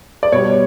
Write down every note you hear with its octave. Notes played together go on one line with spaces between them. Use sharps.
D5
B2 G3 C#5